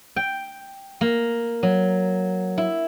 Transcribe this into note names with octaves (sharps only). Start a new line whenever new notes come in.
G5
A#3
F#3
E4